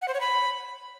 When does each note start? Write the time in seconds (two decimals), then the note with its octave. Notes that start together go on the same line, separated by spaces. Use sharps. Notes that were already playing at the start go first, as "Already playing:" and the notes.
0.02 F#5
0.08 C5
0.14 C#5
0.20 B5